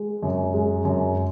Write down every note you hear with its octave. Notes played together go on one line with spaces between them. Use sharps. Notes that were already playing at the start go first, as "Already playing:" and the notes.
Already playing: G#3
F#2
G#3
F#2